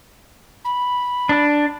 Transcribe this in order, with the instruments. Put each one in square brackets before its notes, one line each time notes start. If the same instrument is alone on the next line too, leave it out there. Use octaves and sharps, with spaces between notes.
[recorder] B5
[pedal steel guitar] D4